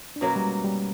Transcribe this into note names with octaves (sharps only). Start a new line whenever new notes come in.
D4
B2 F#3 A#3 C#4
G3
G#3
G3